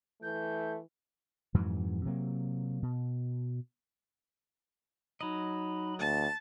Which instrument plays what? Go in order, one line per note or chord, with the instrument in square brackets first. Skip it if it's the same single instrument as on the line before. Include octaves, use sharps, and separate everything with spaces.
[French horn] E3 [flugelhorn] A3 [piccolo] G6
[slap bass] F2 G#2 E3 F#3
C3 F#3 A#3
B2
[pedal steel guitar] F#3 D#5 [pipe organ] D#4 B5
[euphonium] D2 [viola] A5